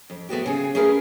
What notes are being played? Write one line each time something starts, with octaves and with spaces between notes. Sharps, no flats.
F2
A3 B3 F#4 G4
C#3 G#4
A3 C#4 G#4 A#4 B4